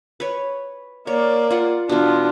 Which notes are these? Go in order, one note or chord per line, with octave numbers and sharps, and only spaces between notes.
B4 C#5
A#3 C#5 D5
F4 F#5
B2 E3 D4 F4